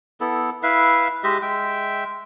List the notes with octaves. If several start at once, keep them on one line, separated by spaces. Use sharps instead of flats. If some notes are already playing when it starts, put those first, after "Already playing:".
B3 E4 A4
E4 B4 E5 F5
G#3 G4 D#5 E5
G#3 E5 G5